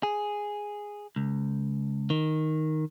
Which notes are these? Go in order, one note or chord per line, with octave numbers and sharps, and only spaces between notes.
G#4
C#2
D#3